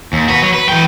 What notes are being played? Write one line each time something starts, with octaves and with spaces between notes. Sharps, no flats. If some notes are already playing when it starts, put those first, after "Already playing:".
D#2
F#4 B4
F#3
B4
E3 G5